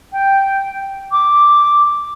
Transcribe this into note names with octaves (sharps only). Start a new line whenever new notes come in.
G5
D6